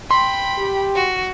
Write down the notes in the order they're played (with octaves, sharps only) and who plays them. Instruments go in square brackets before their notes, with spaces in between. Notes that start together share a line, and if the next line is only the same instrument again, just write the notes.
[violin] G5 B5 [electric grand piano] C6
[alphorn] G4
[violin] F#4